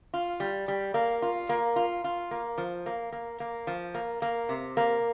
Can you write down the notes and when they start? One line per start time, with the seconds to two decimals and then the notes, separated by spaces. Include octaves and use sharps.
0.14 F4
0.40 G3
0.68 G3
0.94 A#3
1.22 F4
1.49 A#3
1.76 F4
2.04 F4
2.31 A#3
2.58 F3
2.86 A#3
3.12 A#3
3.40 A#3
3.67 F3
3.94 A#3
4.22 A#3
4.49 C3
4.77 A#3